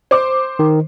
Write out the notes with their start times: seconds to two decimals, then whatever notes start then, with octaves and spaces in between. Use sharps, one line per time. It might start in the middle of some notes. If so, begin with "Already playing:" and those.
0.11 C5 D6
0.59 D#3